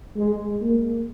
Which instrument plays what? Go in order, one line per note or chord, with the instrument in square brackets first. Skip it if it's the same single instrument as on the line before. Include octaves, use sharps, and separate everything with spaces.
[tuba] G#3
A#3